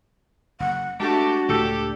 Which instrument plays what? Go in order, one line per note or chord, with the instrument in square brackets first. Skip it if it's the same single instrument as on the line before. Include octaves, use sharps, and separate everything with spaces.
[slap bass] F#1 [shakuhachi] F#5
[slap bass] G#3 [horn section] A3 G4 A5 [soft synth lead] D4 [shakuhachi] F#4
[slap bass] C#2 A2 A3 [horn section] G4 A4